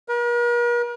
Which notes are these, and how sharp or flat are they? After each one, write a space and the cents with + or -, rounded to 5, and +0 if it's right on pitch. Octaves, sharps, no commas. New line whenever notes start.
A#4 +45